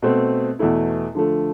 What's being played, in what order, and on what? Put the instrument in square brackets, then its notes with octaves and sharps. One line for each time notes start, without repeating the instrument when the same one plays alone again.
[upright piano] B2 A3 C4
E2 B2 A3 E4
D3 F3 A3